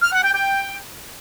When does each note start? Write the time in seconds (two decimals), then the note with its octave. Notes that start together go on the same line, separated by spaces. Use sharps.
0.02 F6
0.12 F#5
0.22 G5
0.33 G5